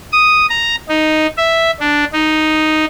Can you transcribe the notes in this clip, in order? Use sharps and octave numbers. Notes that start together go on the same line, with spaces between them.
D#6
A#5
D#4
E5
D4
D#4